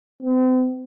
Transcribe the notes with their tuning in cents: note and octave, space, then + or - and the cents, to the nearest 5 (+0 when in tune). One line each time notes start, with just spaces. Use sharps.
C4 -40